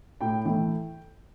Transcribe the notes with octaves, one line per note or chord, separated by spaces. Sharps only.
A2 G5
E3 A3 G5